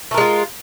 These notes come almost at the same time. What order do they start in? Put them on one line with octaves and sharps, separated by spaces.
A3 A#4 G#3 F4